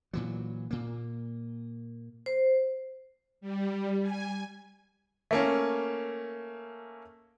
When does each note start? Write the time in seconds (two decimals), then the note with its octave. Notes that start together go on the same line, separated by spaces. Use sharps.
0.13 A#2 E3 F#3
0.71 A#2 A#3
2.26 C5
3.41 G3
4.02 G#5
5.31 A3 A#3 C#4